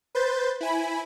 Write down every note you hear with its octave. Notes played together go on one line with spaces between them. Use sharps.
B4 C5 G6 A6
E4 G#5 B5